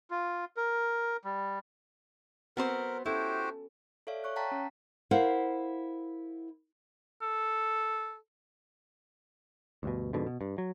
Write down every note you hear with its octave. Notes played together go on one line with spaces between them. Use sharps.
F4
A#4
G3
B3 C4 F#4 A#4 C5
C#4 E4 F#4 G4 A4 C5
A4 C#5 D5 E5 F5
C#5 C#6 F#6
F5 G5 A5 A#5 B6
C#4
E4 A#4 C5 F5 F#5
A4
D2 G2 B2
F2 G#2 B2 D3
B2
G2
F#3